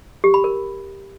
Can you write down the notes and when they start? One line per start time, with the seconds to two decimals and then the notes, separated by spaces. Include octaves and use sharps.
0.24 G4
0.34 B5
0.44 A#4